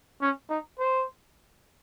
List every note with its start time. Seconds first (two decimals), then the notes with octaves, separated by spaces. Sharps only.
0.21 C#4
0.50 D#4
0.79 C5